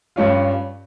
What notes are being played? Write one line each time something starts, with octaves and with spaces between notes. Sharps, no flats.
G2 G3 C#4 F4